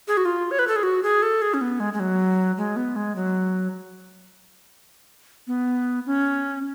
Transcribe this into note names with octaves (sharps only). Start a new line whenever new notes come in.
G#4
F#4
F4
C#5
B4
A4
G#4
F#4
G#4
A4
G#4
C#4
B3
G#3
G#3
F#3
G#3
B3
G#3
F#3
B3
C#4